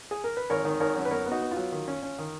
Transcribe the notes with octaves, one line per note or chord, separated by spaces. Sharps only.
G#4
A#4
B4
G#1 A#4 C#5
D#3
G#1 A#4 C#5
F#2
B4
B3 A#4 C#5
B3
D#4 F#4
B3
F4
F#3
D#3
C#4
C#4
D#3